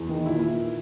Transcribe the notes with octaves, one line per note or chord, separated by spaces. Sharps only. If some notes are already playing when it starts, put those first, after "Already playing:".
Already playing: E2
D#3
A#2 E4